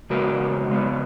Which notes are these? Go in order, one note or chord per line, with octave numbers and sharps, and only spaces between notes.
C#3 G#3 B3 F#4 A#4
C#3 G#3 B3